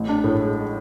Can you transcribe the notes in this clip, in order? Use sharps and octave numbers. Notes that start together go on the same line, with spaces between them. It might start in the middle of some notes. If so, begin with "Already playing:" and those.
Already playing: A1
D4
A2
G#3